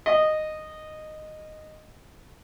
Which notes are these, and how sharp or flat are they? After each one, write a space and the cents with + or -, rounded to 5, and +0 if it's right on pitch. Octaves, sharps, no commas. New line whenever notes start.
D#5 -10